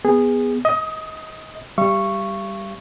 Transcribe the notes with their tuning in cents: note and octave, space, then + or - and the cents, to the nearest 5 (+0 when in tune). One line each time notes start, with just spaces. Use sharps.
B3 +0 G#4 -15
D#5 +25 D#6 +0
G3 +0 F5 -45 C#6 -5